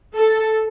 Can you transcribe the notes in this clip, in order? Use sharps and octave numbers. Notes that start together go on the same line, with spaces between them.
A4